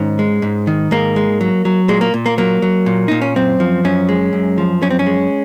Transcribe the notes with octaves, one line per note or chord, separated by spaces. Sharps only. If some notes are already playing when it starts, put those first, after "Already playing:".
Already playing: G#2 D#3 C#4
G#3
G#2
D#3
G#2 A#3
G#3
F#3
F#3
A#2 G#3
A#3
A#2
A#3
F#3 A#3
F#3
A#2
A#2 D#4
C#4
F#2 C4
F3
F#2 C#4
G#3
F#2
F3
F#2 C#4
C4
C#4
G#3